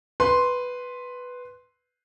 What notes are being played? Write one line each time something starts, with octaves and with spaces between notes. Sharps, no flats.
B4 C6